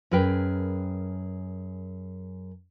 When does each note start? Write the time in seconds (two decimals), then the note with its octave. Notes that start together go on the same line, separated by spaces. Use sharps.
0.11 F#2 G#4 A#4 B4 G5